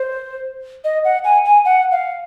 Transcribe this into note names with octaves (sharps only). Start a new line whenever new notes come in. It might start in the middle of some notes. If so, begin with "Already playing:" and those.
Already playing: C5
D#5
F#5
G#5
G#5
F#5
F5